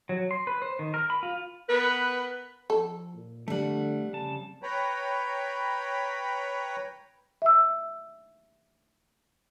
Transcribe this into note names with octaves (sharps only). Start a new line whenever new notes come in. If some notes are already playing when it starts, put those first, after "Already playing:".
F#3
C6
B4
C5
D#3
A#4
B5
F4
B3 A#4 B4
F3 A4
A#2
F2 D3 G3 A3 F#5
C#3 A5
B4 C#5 G5 A#5 B5
E5 E6